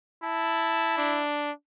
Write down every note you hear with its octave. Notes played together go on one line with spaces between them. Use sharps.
E4 A5
D4